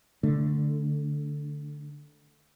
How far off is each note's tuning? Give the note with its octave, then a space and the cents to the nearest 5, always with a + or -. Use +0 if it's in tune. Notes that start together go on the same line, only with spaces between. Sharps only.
D3 +0 A3 +0